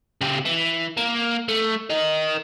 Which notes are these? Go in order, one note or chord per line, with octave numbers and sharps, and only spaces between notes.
C#3 G4
E3
A#3
A3
A#4 D#5